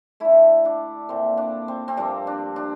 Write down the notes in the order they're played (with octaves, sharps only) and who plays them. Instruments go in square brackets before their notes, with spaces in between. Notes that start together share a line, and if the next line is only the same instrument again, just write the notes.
[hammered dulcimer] D3 A3 E4
D4
A#2 A3 C4
D4
C4
C4
G2 F3 A#3 D4
D4
D4